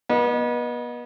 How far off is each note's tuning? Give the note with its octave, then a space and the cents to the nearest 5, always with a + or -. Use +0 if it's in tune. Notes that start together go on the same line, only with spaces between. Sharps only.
B3 -35 D#5 -10